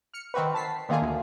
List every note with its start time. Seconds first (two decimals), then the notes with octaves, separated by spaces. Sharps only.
0.14 F6 C#7
0.34 D#3 C4 F#4 B4
0.54 A5 B6 C7
0.89 D3 D#3 A#3 F4 G#4
1.02 D2